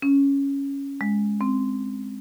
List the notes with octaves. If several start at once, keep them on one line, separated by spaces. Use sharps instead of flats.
C#4
G#3
C4